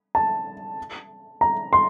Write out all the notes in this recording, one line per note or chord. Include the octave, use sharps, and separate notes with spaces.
A5
A#5
C6